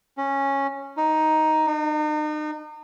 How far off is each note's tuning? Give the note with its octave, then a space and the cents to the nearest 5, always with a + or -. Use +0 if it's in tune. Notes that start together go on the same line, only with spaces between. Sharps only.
C#4 -10
D#4 +5
D#4 -40